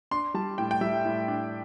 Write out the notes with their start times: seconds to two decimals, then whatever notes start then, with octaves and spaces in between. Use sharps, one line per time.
0.11 D4 C6
0.34 G3 A5
0.58 A2 G5
0.71 G5
0.81 G3 E5
1.05 A2
1.28 D4